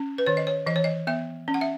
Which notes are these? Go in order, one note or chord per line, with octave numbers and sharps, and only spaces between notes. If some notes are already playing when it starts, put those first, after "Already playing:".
Already playing: C#4
B4
D#3 C#5
D#5
C#5
E3 D#5
C#5
D#5
B3 E5
C#4
F#5
E5